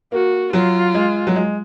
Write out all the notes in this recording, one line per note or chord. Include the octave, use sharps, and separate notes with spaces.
A#3 F#4
F#3 F4
G#3
F#3
G#3